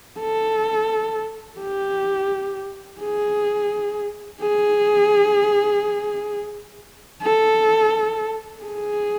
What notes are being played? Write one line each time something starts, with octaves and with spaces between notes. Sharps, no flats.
A4
G4
G#4
G#4
A4
G#4